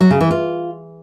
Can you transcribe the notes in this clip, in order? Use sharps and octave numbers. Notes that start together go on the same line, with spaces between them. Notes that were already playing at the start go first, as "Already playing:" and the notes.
F#3
C#3
E3
F4